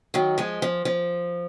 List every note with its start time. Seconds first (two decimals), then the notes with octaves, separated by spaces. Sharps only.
0.14 D#3 F#3
0.38 F3 G#3
0.62 F3
0.85 F3